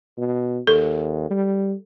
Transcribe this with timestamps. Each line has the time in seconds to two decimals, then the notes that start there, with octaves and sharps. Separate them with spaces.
0.18 B2
0.67 D#2 A4
1.31 G3